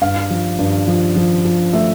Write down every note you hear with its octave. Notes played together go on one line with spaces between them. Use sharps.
G2 F5
F3
G2
F3
F3
F3
A3 E5